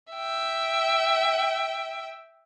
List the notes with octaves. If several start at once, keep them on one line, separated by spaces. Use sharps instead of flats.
E5 G5